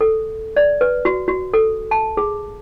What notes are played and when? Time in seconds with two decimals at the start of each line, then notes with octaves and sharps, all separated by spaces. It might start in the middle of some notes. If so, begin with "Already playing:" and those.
0.01 A4
0.57 D5
0.81 B4
1.05 F#4
1.28 F#4
1.53 A4
1.91 A5
2.17 G#4